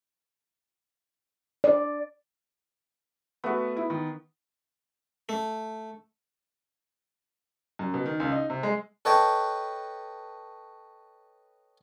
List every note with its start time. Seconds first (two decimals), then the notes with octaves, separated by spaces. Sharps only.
1.64 D5
3.44 A3 B3 F#4
3.77 E4
3.90 D#3
5.29 A3
7.79 F#2
7.94 B2
8.06 D#3
8.20 C#2
8.32 D#4
8.50 C3
8.63 G#3
9.05 A4 B4 C#5 D#5 G5 A5